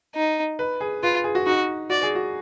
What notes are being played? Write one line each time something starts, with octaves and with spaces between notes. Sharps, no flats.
D#4
B4
G#4
F4 B4
G#4
F#4
D#4 F#4
F#4 D5
G#4
F#4